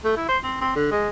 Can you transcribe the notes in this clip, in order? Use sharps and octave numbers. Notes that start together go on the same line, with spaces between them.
A3
E4
C5
C4
C4
D3
G#3